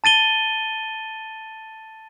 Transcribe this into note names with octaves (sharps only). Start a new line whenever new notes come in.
A5 A6 D#7 G7